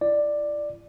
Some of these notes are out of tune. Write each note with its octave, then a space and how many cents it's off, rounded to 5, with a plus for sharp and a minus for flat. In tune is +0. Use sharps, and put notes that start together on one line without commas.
E4 +40 D5 +10